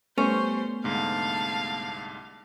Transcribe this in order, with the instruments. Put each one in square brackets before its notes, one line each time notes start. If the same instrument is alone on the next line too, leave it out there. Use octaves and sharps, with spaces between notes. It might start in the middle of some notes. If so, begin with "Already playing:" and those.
[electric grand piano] G3 C#6 [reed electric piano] A3 B3 [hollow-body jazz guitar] C#4 [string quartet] C5
[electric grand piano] C2 G#2 D3 [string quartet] F5 A5